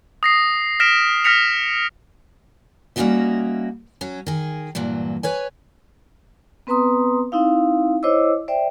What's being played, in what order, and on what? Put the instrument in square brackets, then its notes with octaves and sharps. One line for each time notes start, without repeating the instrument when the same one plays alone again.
[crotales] D#6 A#6 C7
F6 A#6 B6 D7 E7
F6 A#6 B6 C#7 F7
[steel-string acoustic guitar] G3 A#3 C#4 D#4 F#4 E5
F#3 C#4
D#3 G#4
G2 A#2 E3 F#3
B4 C#5 G#5
[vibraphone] B3 C4 B4 A#5 C6 D#6
C4 D#4 E4 F5
E4 C5 C#5 D#5 D6 E6
C5 D5 E5 G5